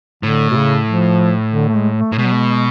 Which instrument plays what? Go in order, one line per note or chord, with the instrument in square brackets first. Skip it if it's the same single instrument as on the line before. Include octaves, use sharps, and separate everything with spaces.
[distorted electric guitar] A2 [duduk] D3
[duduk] B2
C#3
F3
D3
A3
G#3
A3
[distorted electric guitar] A2
[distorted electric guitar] B2 [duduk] G#3
[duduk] F#3
G#3